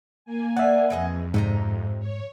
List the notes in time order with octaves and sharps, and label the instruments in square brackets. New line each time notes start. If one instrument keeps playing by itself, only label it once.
[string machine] A#3 G#5
[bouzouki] D5 [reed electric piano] E5 F#5
[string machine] F2 [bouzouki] E3 G#4 D#5
[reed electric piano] G#2 [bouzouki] C3 D#4 A#5
[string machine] C#5